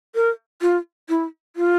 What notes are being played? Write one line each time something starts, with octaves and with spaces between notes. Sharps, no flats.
A#4
F4
E4
F4